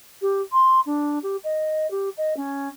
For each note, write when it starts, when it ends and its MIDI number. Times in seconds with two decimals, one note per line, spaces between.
0.21 0.41 67
0.52 0.80 84
0.86 1.19 62
1.23 1.36 67
1.44 1.90 75
1.90 2.09 67
2.17 2.36 75
2.36 2.69 61